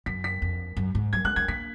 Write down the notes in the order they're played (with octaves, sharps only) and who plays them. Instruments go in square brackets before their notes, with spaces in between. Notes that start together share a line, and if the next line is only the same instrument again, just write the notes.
[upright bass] F#2 [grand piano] B6
[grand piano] B6
[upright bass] F2
F#2
G#2
[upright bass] F#3 [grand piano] G#6
[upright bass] G#3 [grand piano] F#6
[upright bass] G#3 [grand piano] G#6
[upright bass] A#3 [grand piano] B6